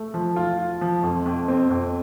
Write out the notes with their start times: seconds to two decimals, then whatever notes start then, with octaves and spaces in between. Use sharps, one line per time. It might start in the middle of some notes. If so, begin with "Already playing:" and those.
Already playing: A3
0.14 F3
0.36 F4
0.58 F4
0.81 F3
1.03 F2
1.26 F2
1.48 C4
1.70 F2